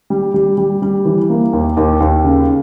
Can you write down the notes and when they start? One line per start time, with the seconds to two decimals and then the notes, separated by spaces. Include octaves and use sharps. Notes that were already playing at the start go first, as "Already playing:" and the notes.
0.10 G3
0.34 G3
0.58 G3
0.82 G3
1.05 E3
1.30 A#3
1.53 D#2
1.77 D#2
2.00 D#2
2.24 C#3